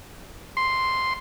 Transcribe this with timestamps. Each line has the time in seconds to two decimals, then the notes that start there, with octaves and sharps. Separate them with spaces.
0.57 C6